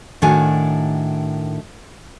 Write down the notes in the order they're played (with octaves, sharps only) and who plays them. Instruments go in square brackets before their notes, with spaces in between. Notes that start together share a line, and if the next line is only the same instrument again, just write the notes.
[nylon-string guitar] A2 D#3 D4 F#4 G#5